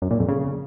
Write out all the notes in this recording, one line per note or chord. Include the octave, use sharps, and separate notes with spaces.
F#2
A#2
F2
C#3